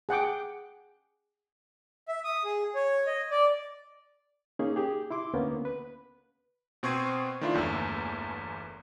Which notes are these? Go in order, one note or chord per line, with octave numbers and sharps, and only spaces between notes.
G#4 F#5 G5 D6
E5
D#6
G#4
C#5
D#5
D5
A#3 C#4 D#4 G#4
G4 G#4
E4 C6 D6
D2 A#3 B3 C#4
B4
B2 C4 C#6 G#6 C7 D#7
D#3 A3 D4 E4 F4
G1 E2 A3 A#3 E6